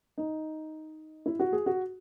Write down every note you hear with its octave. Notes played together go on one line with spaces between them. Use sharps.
D#4
E4
F#4
G#4
F#4